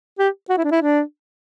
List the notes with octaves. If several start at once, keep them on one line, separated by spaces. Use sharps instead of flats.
G4
F#4
E4
D4
E4
D4